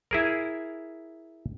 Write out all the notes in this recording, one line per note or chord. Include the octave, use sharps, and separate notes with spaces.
E4 G#4 A#4